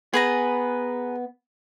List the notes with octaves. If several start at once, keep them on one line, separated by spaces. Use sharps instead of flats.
B3 G#4 B4 A#5